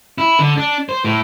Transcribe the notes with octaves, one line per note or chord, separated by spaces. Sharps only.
E4
D3
D4
C5
A2